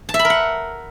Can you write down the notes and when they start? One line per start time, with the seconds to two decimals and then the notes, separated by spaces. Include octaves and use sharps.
0.09 A5
0.14 E5
0.19 B5
0.25 A#4
0.30 F#5